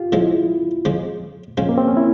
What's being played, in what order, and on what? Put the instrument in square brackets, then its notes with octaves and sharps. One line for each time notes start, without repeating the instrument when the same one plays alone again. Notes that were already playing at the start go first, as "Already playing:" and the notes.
Already playing: [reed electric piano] F4 G4
[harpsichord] C#3 F3 G#3 [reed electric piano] E4
[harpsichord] C#3 F3 G#3
[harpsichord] C#3 F3 G#3 [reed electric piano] C#4
[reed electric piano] A#3
C4
C#4
E4